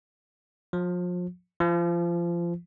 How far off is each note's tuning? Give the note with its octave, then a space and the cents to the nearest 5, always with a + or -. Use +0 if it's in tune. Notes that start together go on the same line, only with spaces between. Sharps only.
F3 +35
F3 -25